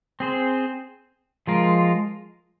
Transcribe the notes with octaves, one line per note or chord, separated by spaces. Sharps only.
C4 G#4 C5
F3 G#3 F4 A#4